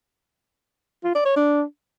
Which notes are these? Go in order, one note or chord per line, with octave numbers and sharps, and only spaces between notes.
F4
D5
C#5
D4